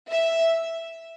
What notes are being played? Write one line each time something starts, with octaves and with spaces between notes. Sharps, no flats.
E5